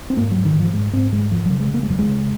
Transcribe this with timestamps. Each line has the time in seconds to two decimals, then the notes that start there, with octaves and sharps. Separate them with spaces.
0.10 C4
0.17 G#2 A#3
0.31 G#2 F#3
0.45 D#3
0.55 G#2
0.60 F3
0.74 G#2 G#3
0.93 G#2 C4
1.12 G#2 G#3
1.31 F2 F3
1.46 C#3 F#3
1.60 G#3
1.70 C#3 A#3
1.83 G#3
1.89 F2 F#3
1.99 G#3
2.08 C#3